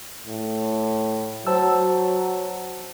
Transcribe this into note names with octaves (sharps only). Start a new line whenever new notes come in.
A2
F#3 C5 A5 E6